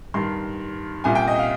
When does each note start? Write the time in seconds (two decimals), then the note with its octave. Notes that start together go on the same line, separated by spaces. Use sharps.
0.14 G2 D#3 C6
1.04 C2 A#2 G#5
1.15 G5
1.28 D#5
1.38 F5